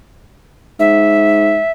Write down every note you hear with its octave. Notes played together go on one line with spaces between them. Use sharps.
G#2 E5